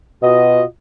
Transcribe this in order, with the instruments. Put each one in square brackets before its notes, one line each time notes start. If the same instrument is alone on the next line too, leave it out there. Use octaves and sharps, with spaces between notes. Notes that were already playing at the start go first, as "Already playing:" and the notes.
[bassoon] B2 [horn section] F4 F#4 D#5